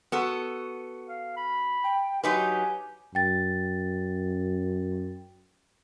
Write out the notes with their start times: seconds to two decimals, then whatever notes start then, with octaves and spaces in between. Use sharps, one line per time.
0.12 B3 F#4 A4
1.08 F5
1.37 B5
1.84 G5
2.23 F#3 D#4 G4 B4 G#5
3.15 F#2 G5 A6